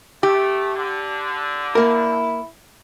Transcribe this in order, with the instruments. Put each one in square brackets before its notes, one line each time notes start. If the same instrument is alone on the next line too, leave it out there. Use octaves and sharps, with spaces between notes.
[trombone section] A3 [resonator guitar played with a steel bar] G4
[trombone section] D3
[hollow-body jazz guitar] A#3 A#4 [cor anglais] E4